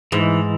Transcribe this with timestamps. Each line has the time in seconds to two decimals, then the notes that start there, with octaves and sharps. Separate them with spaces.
0.12 G#2 E3